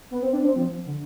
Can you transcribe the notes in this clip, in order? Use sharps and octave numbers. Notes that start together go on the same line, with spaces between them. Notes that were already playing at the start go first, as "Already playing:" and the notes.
B3
C4
D4
C4
F3
D3